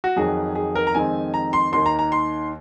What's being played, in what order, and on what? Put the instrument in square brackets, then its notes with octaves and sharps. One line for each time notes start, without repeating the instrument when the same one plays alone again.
[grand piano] F#4
F2 D#3 F#3 G#4
G#4
A#4
A#5
F2 D#3 G#3 C4 G#5
A#5
C6
D#2 D#3 A#3 C6
A#5
A#5
C6